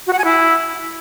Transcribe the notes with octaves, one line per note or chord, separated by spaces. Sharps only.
F#4
F#5
G#5
E4